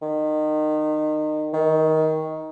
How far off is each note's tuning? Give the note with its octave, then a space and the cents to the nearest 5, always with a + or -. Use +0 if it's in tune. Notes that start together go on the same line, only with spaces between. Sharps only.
D#3 -25
D#3 +20